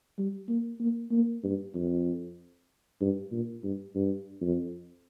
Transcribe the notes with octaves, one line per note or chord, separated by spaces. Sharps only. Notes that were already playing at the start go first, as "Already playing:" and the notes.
G3
A#3
A#3
A#3
G2
F2
G2
A#2
G2
G2
F2